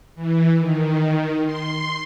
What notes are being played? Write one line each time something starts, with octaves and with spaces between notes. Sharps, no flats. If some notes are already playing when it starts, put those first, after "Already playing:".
E3
D#3
C6